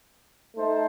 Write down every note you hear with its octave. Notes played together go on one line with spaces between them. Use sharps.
A3 D#4 A4 C5